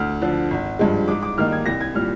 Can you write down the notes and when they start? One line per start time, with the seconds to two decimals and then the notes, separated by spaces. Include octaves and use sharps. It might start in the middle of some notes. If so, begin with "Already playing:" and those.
Already playing: D2 F6
0.22 D3 F3
0.51 G#1
0.79 G2 F3 G#3
1.08 G#2 D6
1.23 D6
1.38 D#3 G3 A#3 D#4 F6
1.52 G#6
1.66 C2 A#6
1.81 G#6
1.94 A#2 G3 F6